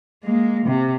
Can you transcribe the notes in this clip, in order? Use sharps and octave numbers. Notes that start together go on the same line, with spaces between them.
G#3 A#3
C3